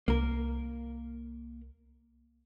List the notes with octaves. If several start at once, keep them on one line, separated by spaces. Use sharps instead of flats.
C2 A#3 A#4